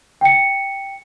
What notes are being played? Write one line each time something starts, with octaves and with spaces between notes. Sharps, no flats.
G5 C#7